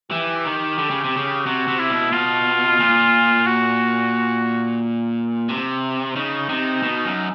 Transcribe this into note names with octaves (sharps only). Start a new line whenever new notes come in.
E3 G4
D#3
D3
C#3
C3
C#3
C3 F#4
C3
E4
B2
B2 F4
A#2
F#4
C3
C#3 D#4
C3
B2
F#2